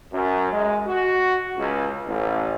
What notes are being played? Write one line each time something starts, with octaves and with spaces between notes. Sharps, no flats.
F#2
G#3
F#4
C#2
A1